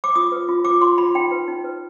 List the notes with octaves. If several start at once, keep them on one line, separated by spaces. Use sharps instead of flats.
D6
F4 D#6
B4
F4
F4 D6
F4 C6
F4 B5
D#4 G5
B4
D#4
B4